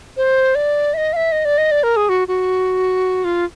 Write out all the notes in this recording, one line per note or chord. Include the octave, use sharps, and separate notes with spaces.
C5
D5
E5
D#5
F5
E5
D#5
D5
D#5
D5
A#4
G#4
F#4
F#4
F4